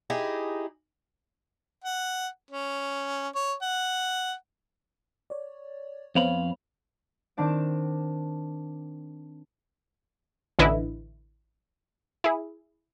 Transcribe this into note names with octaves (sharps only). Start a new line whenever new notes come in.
D#4 E4 G4 G#4
F#5
C#4
C#5
F#5
C#5 D5
F2 B3 C5 C#5 F5 B5
D#3 C4 D4 A5 D7
A1 D3 E3 E4 B4 D#5
E4 G#4